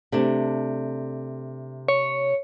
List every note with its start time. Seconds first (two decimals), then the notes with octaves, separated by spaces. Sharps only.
0.12 C3 A3 D4
1.88 C#5